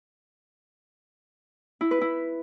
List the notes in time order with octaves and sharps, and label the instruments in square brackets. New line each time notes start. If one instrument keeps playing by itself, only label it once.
[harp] E4
B4
E4